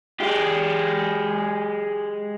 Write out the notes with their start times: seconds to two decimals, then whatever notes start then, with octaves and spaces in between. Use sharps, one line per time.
0.20 G#3 G4